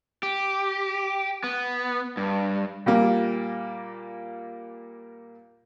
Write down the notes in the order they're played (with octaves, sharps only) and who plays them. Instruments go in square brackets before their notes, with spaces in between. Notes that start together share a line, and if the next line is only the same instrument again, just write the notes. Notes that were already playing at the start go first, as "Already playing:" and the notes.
[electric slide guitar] G4
B3
G2
[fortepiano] A#2 G3 A#3